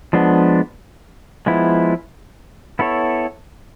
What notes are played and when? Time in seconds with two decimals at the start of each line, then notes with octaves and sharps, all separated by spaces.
0.13 F3 G#3 B3 D4
1.46 F3 G#3 B3 E4
2.79 B3 E4 A4 C#5